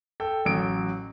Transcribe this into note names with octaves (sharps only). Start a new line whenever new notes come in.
A4 G5
A1 F#3 D7